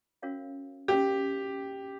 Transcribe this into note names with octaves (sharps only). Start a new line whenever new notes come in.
C#4 F#4 A#4 C#5 F5
C#4 F#4 G4 A#4 C#5 F5